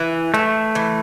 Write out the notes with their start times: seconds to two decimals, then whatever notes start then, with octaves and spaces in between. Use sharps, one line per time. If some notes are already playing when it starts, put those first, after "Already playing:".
Already playing: E3
0.34 E3 A3
0.75 E3